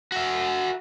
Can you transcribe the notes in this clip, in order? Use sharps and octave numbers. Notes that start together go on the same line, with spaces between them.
F#4 E5